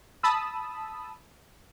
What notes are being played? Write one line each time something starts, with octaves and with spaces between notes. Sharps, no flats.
A5 B5 D#6 E6